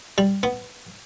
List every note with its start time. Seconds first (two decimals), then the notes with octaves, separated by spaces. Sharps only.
0.18 G3
0.43 B3